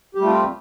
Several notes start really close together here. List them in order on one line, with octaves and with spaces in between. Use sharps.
G4 G3 A3 F4 C4